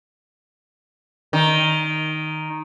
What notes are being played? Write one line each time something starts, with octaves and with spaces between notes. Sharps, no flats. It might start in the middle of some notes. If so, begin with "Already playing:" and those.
D#3